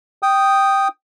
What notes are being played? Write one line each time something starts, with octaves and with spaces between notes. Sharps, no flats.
G5 D#6